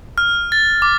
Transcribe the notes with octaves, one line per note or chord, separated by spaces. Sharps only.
F6
A6
D6